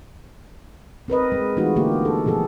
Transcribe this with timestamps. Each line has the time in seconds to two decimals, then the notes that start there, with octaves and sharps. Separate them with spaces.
1.08 C4 A#4 B4 D#5
1.32 G#3
1.57 E3 G#3 A3 D#4 F4 F#4
1.76 D3 A#3 F4 G4 A#4
2.05 A4
2.26 B2 F3 G#4 A4